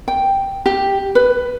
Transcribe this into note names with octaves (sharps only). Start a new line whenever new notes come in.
G5
G4
B4